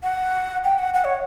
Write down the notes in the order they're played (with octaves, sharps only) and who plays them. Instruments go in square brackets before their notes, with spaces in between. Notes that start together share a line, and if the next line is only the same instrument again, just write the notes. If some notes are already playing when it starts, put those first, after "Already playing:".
[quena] F#5
G5
F#5
F#5
C#5